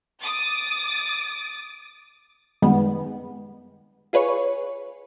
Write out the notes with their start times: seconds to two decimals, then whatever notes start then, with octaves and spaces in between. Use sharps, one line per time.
0.22 D6 D#6 A6
2.62 F#2 D#3 G3 G#3 B3
4.13 F4 G#4 B4 C#5 C#6